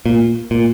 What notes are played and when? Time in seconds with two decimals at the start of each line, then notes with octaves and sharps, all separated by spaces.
0.06 A#2
0.51 A#2